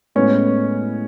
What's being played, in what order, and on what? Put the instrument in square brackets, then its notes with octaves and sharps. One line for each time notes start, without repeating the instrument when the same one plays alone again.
[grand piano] A2 G#3 B3 [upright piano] C#4